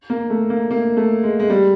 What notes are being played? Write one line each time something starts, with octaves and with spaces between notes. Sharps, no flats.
A#3
A3
A#3
A#3
A3
G#3
G#3
G3